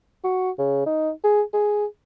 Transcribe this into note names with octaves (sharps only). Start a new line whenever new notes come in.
F#4
C#3
D#4
G#4
G#4